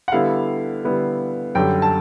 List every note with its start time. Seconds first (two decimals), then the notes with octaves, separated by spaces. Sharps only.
0.08 F#5
0.12 D3 G3 B3 E4 F5
0.84 D3 G3 B3 E4
1.55 F#2 D3 G3 G5
1.82 A5